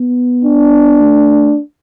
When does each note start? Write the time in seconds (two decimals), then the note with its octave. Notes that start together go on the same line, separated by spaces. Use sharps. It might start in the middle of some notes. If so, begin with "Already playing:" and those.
Already playing: B3
0.45 D4
1.01 A3